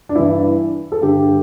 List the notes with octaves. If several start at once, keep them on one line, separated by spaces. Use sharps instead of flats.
D4
G2 E3 E4
A4
G2 D3 G4